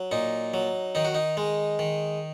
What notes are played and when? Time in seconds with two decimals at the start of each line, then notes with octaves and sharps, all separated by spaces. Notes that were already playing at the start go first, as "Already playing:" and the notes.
Already playing: F#3
0.12 A#2 D#4
0.54 F#3
0.95 D#3 D#4
1.05 F#4
1.15 D#4
1.37 G#3
1.79 D#3